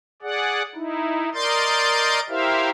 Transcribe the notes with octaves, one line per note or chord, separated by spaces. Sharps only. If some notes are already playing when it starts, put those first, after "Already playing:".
G#4 D5 F#5
D#4 E4
A#4 D5 D#5 C6 G6 A6
E4 G4 A#4 C5 E5 F5